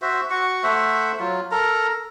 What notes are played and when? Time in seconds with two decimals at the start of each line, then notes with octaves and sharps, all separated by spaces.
0.02 F#4 C5 E5
0.30 F#4 C#6
0.63 A3 C5 E5 F#5
1.20 F#3 F4
1.51 A4 A#4 A#5